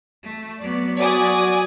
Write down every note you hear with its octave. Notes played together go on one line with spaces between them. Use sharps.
A3
F#3 B3 D5
F#4 D5 G#5 D#6